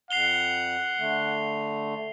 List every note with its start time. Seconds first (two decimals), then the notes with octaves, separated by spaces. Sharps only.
0.11 F2 F#5 C7 F7 G7
0.99 D3 A3